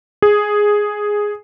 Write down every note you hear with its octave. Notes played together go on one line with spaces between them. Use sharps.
G#4